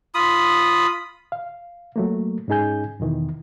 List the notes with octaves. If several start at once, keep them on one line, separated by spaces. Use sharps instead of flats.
F4 B5 D#6
F5
F#3 A3 A#3
G#2 C#4 D#4 G#4 G#5 G6
E2 B2 D#3 E3